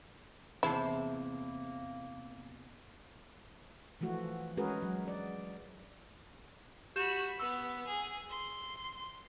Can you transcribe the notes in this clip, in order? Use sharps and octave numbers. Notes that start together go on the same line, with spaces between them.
E2 C3 A#3 E4 G#4 C5 E5 A5
E3 F3 A3 F#4
G#3 C#4 F#4 G#4 A#4 B4
F#3
D5
F#4 G4 B5 G6 E7
B3 E6
G#4
C6